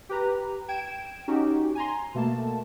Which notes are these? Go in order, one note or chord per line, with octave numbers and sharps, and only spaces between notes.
G4 B4 A#5
G5 G#6 D7 E7
C#4 D#4 F#4 G4
G#5 A#5 C6
B2 A3 A#3 A5